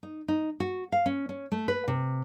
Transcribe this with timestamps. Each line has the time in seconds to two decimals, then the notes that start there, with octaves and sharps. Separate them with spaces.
0.03 D#4
0.28 D#4
0.60 F#4
0.92 F5
1.06 C#4
1.29 C#4
1.52 A3
1.68 B4
1.88 C3